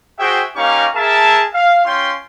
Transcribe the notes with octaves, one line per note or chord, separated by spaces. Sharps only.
F#4 G#4 C5 E5 G5
A#3 C#4 D#4 G4 F5 C#6
G#4 A#4 E5 A5
F5
C#4 F4 G5 C6